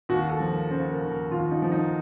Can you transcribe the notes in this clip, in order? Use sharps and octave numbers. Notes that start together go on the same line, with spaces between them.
D#2 F#4
A4
F3
A#4
C#3 C5
A#4
D#2
A#4
D#2 F4
D#4
F3
D#4